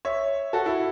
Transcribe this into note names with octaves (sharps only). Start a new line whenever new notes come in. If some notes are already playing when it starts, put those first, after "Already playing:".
C#5 E5
F#4 A4
E4